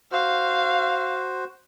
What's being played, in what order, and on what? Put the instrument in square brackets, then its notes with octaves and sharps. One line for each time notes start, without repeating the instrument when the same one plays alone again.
[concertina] F#4 C5 [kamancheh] F5